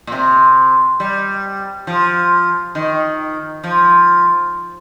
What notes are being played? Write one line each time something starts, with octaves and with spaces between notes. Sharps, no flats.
A#2
C3
G3
F3
D#3
F3